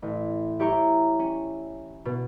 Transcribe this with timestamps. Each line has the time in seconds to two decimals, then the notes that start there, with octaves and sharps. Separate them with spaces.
0.02 A1
0.59 E4 G4 C#5 G5 A#5 C#6
1.19 C#4
2.05 B2